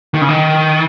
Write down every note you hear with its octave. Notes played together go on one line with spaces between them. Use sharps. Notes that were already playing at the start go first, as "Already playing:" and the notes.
D#3
C#3
D#3